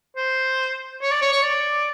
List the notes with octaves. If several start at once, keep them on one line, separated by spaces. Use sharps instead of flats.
C5
C#5
D5
C#5
C#5
D5